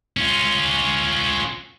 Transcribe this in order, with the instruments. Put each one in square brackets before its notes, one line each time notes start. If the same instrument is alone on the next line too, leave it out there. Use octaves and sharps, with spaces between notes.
[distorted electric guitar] C#4 F4